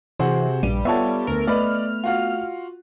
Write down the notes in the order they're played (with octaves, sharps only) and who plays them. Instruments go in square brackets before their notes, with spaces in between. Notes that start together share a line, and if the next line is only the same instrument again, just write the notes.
[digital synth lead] C3 [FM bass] E3 [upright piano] F#4 G#4 C5
[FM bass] A#1 [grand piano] G2 [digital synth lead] G3 [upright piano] D#7
[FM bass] B3 [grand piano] F4 F#5 [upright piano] A4 C#5 E5
[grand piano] D2 [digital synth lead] A#4
[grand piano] A3 B4 [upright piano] D5 D#5 B5 [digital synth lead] F6
[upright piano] F4 F#4 F5